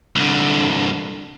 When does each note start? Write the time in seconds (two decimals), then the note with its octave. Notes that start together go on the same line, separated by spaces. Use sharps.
0.16 C2 D3